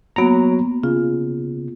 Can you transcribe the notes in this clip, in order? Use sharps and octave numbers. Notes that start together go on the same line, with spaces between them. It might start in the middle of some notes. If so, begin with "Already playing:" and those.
F#3 A#3 B3 A#5
C#3 F4